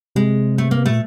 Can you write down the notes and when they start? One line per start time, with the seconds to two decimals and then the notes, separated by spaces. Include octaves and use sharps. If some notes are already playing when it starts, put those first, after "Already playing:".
0.15 C3 G#3
0.58 A3
0.71 A#3
0.86 A#2 A3